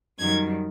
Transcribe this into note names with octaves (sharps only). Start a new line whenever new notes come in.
F#2 D#3 G3 G#6